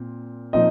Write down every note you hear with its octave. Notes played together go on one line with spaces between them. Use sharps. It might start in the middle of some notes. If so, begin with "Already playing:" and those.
Already playing: A#2 C4
A#2 F3 C4 D#4 D#5